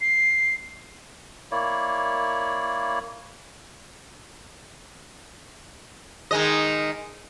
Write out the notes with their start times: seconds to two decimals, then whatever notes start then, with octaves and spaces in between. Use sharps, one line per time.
0.01 C7
1.51 A#3 E4 C#5 D5
6.31 D#3 G#3 D#5